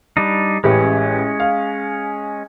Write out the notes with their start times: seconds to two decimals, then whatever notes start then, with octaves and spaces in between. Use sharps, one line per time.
0.17 G3 D4 D#4
0.64 A1 G#3 C#4 G4 B4
1.40 F5